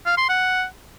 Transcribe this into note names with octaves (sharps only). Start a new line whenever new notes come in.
F5
C6
F#5